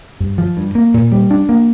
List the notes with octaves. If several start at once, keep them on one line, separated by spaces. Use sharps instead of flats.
G2
F3
G2
A#3
A#2
G3
D4
A#3